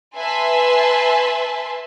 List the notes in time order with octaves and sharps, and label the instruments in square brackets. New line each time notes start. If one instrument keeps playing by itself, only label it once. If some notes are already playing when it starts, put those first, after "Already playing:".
[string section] B4 E5 G#5 A5 C6